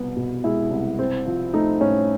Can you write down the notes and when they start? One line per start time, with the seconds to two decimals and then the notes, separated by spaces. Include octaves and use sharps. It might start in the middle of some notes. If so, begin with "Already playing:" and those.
Already playing: C2 B2 B3
0.16 B2
0.44 G#3 E4
0.71 C2
0.99 C4
1.26 F3
1.54 A3 D#4
1.81 A2 C#4